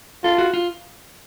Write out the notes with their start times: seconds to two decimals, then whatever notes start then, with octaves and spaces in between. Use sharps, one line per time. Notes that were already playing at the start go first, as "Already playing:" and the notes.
0.24 F4 A4
0.38 F#4
0.54 F4